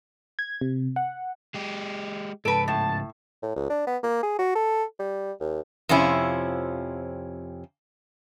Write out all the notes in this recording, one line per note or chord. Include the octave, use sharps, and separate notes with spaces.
G#6
C3
F#5
G#3 G4
C#2 G#2 A4 B4 D7
A2 A5
A2
C#2
D4
B3
A#3
G#4
F#4
A4
G3
D#2
F2 C3 F3 C#4 E4